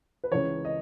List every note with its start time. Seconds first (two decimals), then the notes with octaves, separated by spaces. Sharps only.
0.24 B4
0.32 C#2 C#3 E3 C#5
0.65 D#5